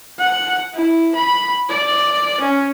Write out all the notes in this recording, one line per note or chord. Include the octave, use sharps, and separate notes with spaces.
F#5
E4
B5
D5
C#4